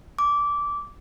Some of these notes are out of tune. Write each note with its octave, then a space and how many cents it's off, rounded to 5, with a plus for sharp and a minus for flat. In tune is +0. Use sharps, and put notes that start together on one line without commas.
D6 -15